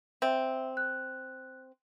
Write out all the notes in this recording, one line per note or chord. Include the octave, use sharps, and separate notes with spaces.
C4 E5
F#6